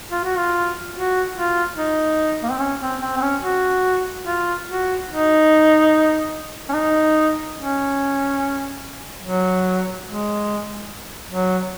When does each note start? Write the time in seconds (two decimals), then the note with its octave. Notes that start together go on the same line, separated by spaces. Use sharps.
0.11 F4
0.24 F#4
0.37 F4
0.94 F#4
1.35 F4
1.77 D#4
2.43 A#3
2.51 C4
2.60 C#4
2.81 C4
3.02 C4
3.17 C4
3.22 C#4
3.42 F#4
4.25 F4
4.67 F#4
5.09 D#4
6.69 C#4
6.74 D#4
7.57 C#4
9.23 F#3
10.06 G#3
11.29 F#3